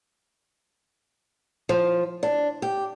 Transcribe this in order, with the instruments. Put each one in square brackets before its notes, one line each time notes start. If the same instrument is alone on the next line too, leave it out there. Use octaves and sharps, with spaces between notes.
[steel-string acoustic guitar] F3
D4
G4